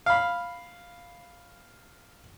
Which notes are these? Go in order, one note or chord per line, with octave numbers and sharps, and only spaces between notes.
F5 B5